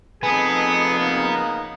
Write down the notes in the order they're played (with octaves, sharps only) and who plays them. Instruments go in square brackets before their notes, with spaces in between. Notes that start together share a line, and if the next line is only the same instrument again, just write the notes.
[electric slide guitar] F2 G#5 [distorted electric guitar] B3 [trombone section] D#4 A4 B4 [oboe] G#4
[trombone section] C#3 A#3 D#4